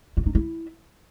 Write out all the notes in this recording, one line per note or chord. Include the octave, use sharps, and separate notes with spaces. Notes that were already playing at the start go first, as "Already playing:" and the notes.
F4
D#4
E4